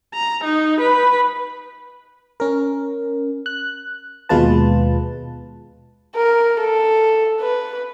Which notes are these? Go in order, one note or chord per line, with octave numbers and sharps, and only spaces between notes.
A#5
D#4
B4
C#4 A#4
F#6
D#2 B2 G#3 F4 B4 A5
A#4
A4
B4